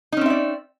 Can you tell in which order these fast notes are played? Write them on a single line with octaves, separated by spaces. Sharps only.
D#4 C#4 C4 E5 D5